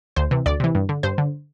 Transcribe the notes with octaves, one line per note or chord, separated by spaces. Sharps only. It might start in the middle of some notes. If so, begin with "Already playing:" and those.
D2 C5
C3 E3
D2 D5
C3 E3
G2
D3
G2 C5
D3